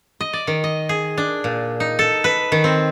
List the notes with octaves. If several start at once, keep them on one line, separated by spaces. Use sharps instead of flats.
D#5
D5
D#3
D#5
G#4
D4
A#2
D#4
A4
B4
D#3
C4